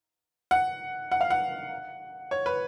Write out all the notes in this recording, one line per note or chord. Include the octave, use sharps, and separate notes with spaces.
F#5
F#5
F5
F#5
C#5
B4